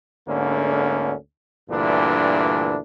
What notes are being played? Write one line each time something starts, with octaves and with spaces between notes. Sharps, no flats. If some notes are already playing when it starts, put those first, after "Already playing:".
D2 G#2 D3 A#3 C#4
D2 G2 A#2 E3 D4